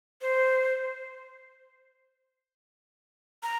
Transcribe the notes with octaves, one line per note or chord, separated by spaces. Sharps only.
C5
A#5